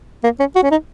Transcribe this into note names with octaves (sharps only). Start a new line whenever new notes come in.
A#3
C#4
F#4
C#4
D#4